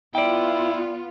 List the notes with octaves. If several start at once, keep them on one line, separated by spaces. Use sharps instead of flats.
B3 E4 F4 D5 G5